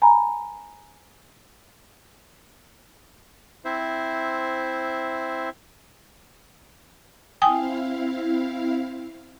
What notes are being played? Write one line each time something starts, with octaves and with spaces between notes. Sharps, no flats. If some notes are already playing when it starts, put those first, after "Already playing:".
G#5 A#5 B5
C4 E4 C5 E5
C4 E4 F5 G5 G#5 D#6